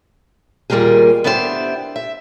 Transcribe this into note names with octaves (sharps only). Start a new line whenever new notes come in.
D#2 A#2 G3 A#3 G4 G#4
B3 D4 E4 G4 A4 C5
E5